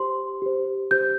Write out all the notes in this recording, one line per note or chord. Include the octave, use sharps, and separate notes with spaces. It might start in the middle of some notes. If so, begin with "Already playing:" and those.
Already playing: G4 C5 C6
G4 C5
G4 C5 G6